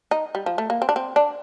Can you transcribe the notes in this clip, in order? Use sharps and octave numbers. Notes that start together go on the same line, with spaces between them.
D#4
G3
F3
A3
A#3
C4
D4
C4
D4